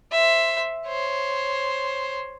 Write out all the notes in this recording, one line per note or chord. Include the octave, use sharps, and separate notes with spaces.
C5 E5
C5 C#5